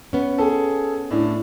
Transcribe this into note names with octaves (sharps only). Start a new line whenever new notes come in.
B3 C#4
G#4 A4
A2 D4